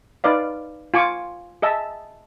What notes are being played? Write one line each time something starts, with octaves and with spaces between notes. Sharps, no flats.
D#4 B4 D5 F5
F4 G#5 C#6 D6
G#4 D#5 E5 A5